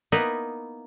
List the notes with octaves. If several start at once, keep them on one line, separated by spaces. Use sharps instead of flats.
A#3 B3 D#4 E4 A#4 B4